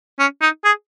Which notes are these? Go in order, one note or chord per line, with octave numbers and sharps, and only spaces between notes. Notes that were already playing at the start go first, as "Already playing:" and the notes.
C#4
D#4
G#4